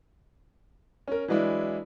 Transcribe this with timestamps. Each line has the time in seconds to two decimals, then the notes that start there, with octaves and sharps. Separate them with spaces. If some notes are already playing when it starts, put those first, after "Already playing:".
1.08 C#4 A#4
1.28 E3 F#3 G#3 D4 E4